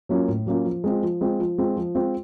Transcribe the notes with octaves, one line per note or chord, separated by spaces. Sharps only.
F#3 A#3 C#4 F4
A2
F#3 A#3 C#4 F4
F3
G#3 C4 F4
F3
G#3 C4 F4
F3
G#3 C4 F4
F3
G#3 C4 F4